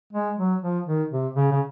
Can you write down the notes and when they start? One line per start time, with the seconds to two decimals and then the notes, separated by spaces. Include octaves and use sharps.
0.13 G#3
0.38 F#3
0.62 F3
0.86 D#3
1.11 C3
1.36 C#3
1.52 C#3